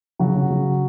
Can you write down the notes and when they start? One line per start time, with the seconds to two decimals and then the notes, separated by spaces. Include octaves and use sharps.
0.19 C#3 F#3 F#4
0.35 C#3
0.50 C#3